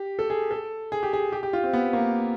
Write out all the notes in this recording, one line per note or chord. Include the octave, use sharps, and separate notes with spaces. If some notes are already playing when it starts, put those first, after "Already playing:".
Already playing: G4
A4
G#4
A4
G#4
G4
G#4
G4
G4
F4
C4
B3
A#3